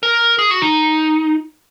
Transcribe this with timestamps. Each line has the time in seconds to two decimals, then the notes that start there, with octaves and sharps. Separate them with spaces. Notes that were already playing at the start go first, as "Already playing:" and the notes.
0.03 A#4
0.39 G#4
0.51 F#4
0.62 D#4